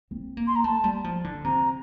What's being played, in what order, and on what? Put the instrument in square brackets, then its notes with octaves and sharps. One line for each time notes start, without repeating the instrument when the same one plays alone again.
[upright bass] C4
A#3
[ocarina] C6
A#5
[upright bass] A3 [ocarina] A5
[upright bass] G3
F3
D3
[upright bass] C3 [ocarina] A#5